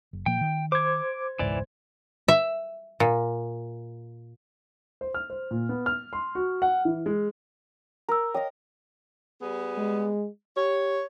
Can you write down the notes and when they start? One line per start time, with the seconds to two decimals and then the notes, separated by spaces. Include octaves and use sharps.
0.13 F#1
0.26 A#2 F3 A#3 G5
0.41 D#3
0.72 C5 D6 G#6
1.39 E1 C#2 G#2 E3 D5
2.28 E5
3.00 A#2
5.01 C5
5.14 F6
5.30 C5
5.51 A#2
5.69 B3
5.86 F6
6.13 C6
6.35 F#4
6.62 F#5
6.85 E3
7.06 G#3
8.09 A#4 A#5 E6
8.34 C#5 D#5 F5 G5 D#6
9.42 G3 B3 G#4
9.78 G#3
10.57 G4 C#5